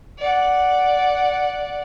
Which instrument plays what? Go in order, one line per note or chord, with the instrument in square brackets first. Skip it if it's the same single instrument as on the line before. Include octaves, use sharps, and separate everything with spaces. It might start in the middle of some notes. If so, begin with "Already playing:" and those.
[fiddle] D5 F#5